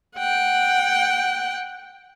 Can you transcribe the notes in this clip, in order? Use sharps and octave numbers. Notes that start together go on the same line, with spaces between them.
F#5 G5